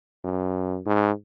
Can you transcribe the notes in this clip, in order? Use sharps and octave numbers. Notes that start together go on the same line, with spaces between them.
F#2
G#2